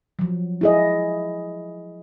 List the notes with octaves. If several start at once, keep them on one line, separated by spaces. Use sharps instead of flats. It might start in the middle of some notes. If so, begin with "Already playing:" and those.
F3 F#3
E4 G#4 D#5